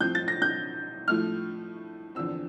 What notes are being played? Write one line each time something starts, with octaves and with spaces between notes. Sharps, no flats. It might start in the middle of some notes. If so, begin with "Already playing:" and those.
A2 F3 C4 G6
A6
A#6
G6
A2 F3 A3 F6
E2 D3 F3 C4 E6